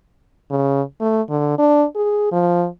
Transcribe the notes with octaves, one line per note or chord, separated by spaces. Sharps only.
C#3
A3
D3
D4
G#4
F3